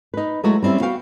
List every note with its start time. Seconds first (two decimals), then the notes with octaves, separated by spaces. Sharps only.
0.14 D#4 B4
0.43 F#3 G#3 A3 E4 F#4
0.62 G3 C4 C#4 E4
0.81 B3 F#4 F5 G5